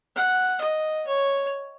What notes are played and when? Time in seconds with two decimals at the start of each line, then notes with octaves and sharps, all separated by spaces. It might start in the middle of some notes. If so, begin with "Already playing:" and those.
0.16 F#5
0.61 D#5
1.06 C#5